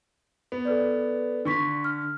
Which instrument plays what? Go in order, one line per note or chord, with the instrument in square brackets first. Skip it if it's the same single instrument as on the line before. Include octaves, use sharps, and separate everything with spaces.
[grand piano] B3
[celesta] A4 B4 D5
[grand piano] D3 [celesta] D4 C#6 B6
[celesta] F6